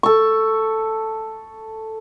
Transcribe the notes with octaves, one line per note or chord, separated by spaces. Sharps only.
A4 C#6